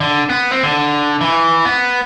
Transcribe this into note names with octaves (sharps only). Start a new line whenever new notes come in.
D3
B3
C4
D3
E3
B3